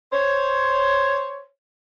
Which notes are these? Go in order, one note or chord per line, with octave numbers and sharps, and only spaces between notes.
C5 C#5